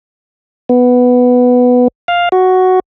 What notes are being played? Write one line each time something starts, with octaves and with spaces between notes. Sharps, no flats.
B3
F5
F#4